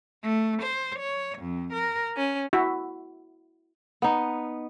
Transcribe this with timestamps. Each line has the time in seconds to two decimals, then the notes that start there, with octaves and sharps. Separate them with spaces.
0.23 A3
0.61 C5
0.98 C#5
1.38 F2
1.72 A#4
2.16 C#4
2.53 E4 F#4 E5
4.02 B3 D#4